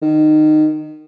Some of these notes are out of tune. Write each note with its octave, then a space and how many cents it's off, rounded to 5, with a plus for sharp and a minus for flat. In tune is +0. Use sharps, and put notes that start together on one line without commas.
D#3 -20